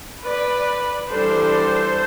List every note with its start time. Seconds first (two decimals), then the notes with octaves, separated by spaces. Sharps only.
0.23 B4 D5
1.10 E3 G3 D4 A4 C5